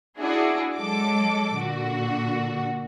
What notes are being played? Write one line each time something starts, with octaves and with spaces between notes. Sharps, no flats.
D4 E4 F#4 G#4
F#3 G#3 A4 D6
A#2 D3 F#4